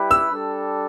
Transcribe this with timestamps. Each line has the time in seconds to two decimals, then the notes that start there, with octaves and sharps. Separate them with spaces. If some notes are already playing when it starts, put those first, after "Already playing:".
Already playing: G3 E4 G4 B4
0.11 E6
0.29 G3 D4 A4